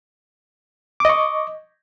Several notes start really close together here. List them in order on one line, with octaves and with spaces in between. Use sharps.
D6 D#5 C#6